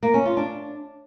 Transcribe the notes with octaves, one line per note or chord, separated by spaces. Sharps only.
A#3
C#4
F4
D4